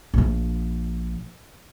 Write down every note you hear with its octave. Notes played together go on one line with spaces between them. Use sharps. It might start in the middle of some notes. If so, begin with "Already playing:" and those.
A#1 F3